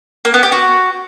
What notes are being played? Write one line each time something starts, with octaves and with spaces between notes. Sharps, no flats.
A#3
B3
G4
F#4